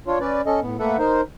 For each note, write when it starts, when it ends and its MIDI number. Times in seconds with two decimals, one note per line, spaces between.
0.07 0.19 62
0.07 0.19 65
0.07 0.19 73
0.20 0.41 61
0.20 0.41 71
0.20 0.41 74
0.46 0.60 61
0.46 0.60 69
0.46 0.60 75
0.62 0.77 45
0.62 0.77 59
0.79 0.97 57
0.79 0.97 58
0.79 0.97 69
0.79 0.97 71
0.79 0.97 76
0.79 0.97 78
0.99 1.21 63
0.99 1.21 70
0.99 1.21 72